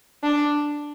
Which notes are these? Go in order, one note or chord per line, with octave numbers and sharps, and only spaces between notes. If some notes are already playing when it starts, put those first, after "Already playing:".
D4